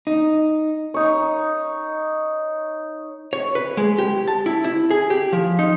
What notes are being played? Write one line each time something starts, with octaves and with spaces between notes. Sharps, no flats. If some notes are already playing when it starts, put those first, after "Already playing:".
D#4
D#4 C#5
C#5
B4
G#3
G4
A5
E4
E4
G#4
G4
F3
D#4